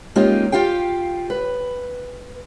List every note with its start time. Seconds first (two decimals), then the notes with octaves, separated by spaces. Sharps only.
0.15 G#3 A#3 C#4 D#4 F4 G4
0.52 F4 G4 F5 G5
1.30 B4